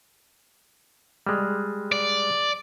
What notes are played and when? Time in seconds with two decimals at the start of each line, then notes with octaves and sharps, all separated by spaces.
1.27 G3 G#3
1.92 D5